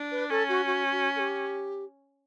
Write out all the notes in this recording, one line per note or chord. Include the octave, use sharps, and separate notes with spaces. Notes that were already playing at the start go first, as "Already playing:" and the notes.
Already playing: D4
B4
C#4 A4
F#4
F#4
F#4
A4
G4